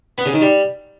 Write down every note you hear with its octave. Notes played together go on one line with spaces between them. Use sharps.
B3
C#3
D#3
G3